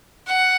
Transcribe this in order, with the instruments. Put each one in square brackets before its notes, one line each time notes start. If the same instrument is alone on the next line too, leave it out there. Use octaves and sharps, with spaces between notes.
[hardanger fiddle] F#5